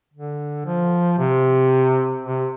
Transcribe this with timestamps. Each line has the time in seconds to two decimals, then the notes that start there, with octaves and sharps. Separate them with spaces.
0.14 D3
0.66 F3
1.19 C3
2.23 C3